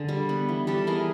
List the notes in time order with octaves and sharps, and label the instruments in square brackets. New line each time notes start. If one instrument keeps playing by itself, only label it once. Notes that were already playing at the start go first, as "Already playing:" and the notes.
Already playing: [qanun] D3 G#4
G3
B3
E3
G3 G4 A4
E3 G#4 A#4